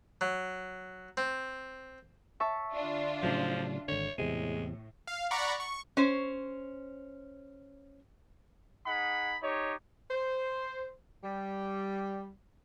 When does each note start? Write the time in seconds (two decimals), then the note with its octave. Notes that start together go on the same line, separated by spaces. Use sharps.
0.21 F#3
1.17 C4
2.40 E5 A5 C#6
2.73 D3 D4 F4
3.23 A2 C#3 F3 F#3
3.88 G#1 D3 C#5
4.18 E2 A2 C3 G#3
5.07 F5
5.31 D5 F#5 A#5 B5 C#6
5.60 C#6
5.97 C#4 C5
8.86 D#4 G#4 F#5 B5
9.42 D#4 G4 C#5
10.11 C5
11.24 G3